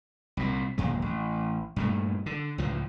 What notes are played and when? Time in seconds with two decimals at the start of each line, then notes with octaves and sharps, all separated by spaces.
0.37 C2 A#2
0.78 F#1 D#2 A#2 G#3
1.02 A1
1.76 G2 A#2 A3
2.26 D3
2.58 C#2 A2 F3